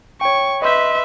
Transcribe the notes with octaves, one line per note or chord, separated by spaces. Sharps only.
C#5 G5 C#6
B4 D#5 E5 C6 G6